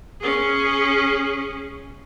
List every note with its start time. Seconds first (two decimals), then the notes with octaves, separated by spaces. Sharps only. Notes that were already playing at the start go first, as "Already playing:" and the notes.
0.21 C#4 G#4